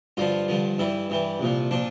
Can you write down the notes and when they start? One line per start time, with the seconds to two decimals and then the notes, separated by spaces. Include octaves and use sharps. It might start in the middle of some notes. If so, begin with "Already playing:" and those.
0.17 G2 D3 F3 F4
0.48 G2 D3 F3
0.78 G2 E3 G3 E4
1.10 G2 E3 G3
1.40 C2 A#2 F3
1.71 A#2 F3 D4